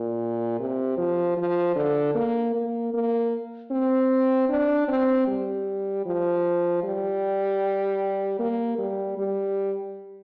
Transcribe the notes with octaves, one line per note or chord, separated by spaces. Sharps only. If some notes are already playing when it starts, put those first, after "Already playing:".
Already playing: A#2
C3
F3
F3
D3
A#3
A#3
A#3
C4
D4
C4
G3
F3
G3
A#3
G3
G3